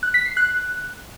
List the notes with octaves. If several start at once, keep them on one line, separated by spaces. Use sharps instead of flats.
F#6
B6
C7
F#6